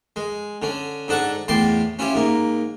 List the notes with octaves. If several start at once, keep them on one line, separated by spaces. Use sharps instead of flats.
G#3
D3 C#4
G#2 D4 A4 F#5 C#6
E2 A2 G5 A5 C6 D6
C#4 E4 F4 G4
G#2 A#3